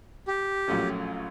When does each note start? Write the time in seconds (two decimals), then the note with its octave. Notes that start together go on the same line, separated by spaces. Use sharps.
0.27 G4
0.68 A#1 A#2 F#3 A3 C#4